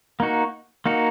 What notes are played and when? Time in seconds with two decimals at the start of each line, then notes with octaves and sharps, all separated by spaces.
0.20 A#3 D#4 F#4
0.86 A#3 D#4 F#4